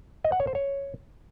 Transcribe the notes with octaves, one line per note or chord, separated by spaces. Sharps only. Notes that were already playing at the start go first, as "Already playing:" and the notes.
D#5
F#5
C#5
C5
C#5